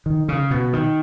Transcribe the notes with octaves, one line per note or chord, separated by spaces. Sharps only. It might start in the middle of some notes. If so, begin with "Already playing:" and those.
D#3
C#3
B2
D#3